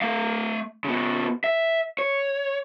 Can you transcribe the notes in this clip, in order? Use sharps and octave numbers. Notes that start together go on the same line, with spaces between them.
A3 F5
C#3 B3
E5
C#5